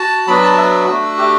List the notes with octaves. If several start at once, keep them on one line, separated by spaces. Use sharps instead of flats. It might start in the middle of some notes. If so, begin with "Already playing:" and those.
Already playing: F#4 A5
F#3 B3 D4 F#4 B5
A5
E5
A3 D4 F#4
G4